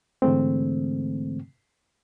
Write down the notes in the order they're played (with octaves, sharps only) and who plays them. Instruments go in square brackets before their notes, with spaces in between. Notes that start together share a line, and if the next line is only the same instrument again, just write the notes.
[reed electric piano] G#2 D3 E3 G#3 A3 C4